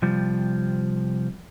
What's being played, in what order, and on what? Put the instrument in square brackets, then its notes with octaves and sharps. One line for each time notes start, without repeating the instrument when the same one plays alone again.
[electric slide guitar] C3 F3 G3